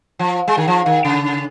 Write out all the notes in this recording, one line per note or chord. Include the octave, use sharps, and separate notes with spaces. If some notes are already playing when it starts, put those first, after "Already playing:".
F3
G#3
D#3
F3
D#3
C#3